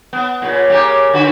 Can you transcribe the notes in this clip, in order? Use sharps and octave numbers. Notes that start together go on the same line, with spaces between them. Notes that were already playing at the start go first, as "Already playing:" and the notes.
B3
A#2 C#3
C#3 A#3 G4
D3 F#4 B4